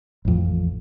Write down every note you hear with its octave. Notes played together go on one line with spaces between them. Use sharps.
A1 F2